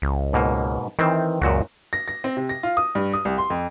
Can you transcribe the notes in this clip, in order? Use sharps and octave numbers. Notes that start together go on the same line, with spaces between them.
C#2
G#2 B2 A#3
D#3 E3 C4
C#2 F#2 A#2 F#4
A#6
A#6
C4
C3
A#6
F4
D#6
G2
D#6
C2
C6
F2